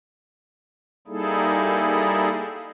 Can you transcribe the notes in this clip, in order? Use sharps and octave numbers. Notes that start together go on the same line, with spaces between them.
G3 A#3 D#4 E4 G#4 A4